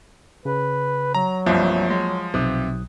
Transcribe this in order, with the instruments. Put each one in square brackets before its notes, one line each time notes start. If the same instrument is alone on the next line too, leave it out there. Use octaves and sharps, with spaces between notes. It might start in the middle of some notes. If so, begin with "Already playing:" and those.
[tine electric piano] C#3 [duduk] B4
[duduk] F#3 [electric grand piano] A#5
[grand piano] G1 C2 [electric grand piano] F3 [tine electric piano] A#3
[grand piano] G#3
[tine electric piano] B1 D#6 F#6 [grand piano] C3